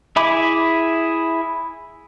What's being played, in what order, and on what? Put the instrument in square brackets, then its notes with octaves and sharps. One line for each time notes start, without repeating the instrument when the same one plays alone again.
[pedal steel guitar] E4 G#4 E5 B5 D6